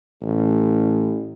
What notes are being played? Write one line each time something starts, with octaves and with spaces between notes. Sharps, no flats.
A1